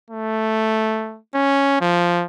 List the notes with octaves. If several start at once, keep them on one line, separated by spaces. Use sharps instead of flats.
A3
C#4
F3